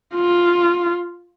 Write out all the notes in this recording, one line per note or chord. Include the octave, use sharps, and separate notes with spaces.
F4